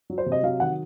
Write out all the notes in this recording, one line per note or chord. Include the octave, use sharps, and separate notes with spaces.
F#3
C5
C3
D#5
F#3 F5
D#3 F#5